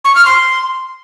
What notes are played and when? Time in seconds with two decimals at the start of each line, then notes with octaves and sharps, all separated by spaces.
0.05 C#6
0.15 F6
0.26 C6